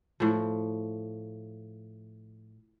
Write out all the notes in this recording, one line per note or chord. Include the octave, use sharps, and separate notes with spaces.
A2 F3